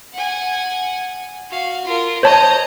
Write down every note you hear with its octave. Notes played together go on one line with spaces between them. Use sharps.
F#5 G#5
F#4 F5
F4 A#4
C5 C#5 D#5 A5 A#5